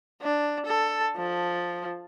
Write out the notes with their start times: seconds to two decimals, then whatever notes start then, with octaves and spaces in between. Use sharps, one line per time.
0.22 D4
0.66 A4
1.17 F3